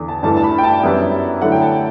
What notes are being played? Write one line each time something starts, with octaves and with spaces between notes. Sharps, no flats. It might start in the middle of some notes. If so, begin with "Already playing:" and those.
Already playing: E2 D3
A5
G2 E3 A3 D4 A5
A5
B5
G5
A5
F#2 E3 G3 B3 E4
D3 F#3 A3 E4 F#5
G5
A5